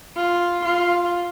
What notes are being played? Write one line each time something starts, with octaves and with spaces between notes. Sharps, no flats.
F4
F4